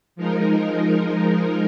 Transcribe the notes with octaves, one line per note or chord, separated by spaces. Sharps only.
F3 G#3 D#4 A#4